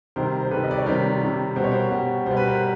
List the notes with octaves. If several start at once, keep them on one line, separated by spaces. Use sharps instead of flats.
C3 D#3 G3 A#4 C5
C5
C3 D#3 G3 A4 B4
D#5
D5
C#5
C3 D#3 G3 A#4 C5
C3 D#3 G3
B2 G3 C5
C#5
A#4 C5
B2 G3
B2 G3 C5
B4
A#4 C5